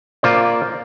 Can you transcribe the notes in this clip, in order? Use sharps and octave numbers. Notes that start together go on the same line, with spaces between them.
A#3 F4 C5 D5